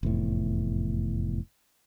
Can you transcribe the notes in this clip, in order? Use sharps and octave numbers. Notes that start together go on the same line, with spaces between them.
F1 E2 A2